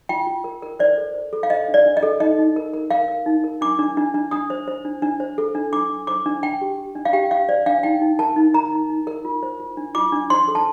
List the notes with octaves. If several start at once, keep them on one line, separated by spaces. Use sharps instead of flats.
F4 G5
F4
A#4
A#4
C5 D5
A4
C5
A4
F5
C5 D#5
D4
D5
D4
D#5
A4
D#4 D#5
D#4
A#4
A#4
A#4 F5
A#4
D#4
A#4
D4 D6
D4
D4
D4
D4 D#6
C5
C5
D4
D4
C5
A4
D4
D4 D6
D4
C5 D6
D4
D4 G5
G4
G4
D4
F5
G4 G5
G4 F5
C5 D5
D4 F5
D#4 G5
D#4
A#4 A5
D#4
A#4 A#5
D#4
D#4
A#4
F4
C5
F4
D4
F4 D6
D4
C5 C6
A4
A5